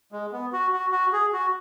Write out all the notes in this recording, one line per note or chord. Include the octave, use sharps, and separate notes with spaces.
G#3
B3
F#4
F#4
F#4
G#4
F#4